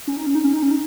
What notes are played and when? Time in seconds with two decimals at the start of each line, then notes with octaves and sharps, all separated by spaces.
0.07 C#4
0.17 D#4
0.27 C#4
0.35 D#4
0.44 C#4
0.53 D#4
0.63 C#4
0.71 D#4